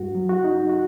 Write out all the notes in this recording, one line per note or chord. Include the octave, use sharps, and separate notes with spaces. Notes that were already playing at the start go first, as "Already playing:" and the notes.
Already playing: G2 F#4
F#3
F#4
D#4
F#4